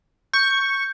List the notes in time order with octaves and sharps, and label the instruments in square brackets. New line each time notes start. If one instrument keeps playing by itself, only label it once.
[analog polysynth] C#6 [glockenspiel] G6